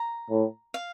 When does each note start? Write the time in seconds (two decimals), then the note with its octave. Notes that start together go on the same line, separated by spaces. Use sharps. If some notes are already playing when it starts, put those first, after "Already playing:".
Already playing: A#5
0.30 A2
0.74 F5